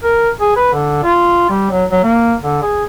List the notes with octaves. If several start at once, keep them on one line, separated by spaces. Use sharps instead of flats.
A#4
G#4
B4
D3
F4
G3
F#3
F#3
A#3
D3
G#4